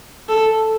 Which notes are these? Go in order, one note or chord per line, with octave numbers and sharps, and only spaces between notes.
A4